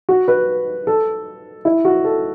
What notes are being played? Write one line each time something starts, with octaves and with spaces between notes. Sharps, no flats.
F#4
B4
A4
E4
F#4
A4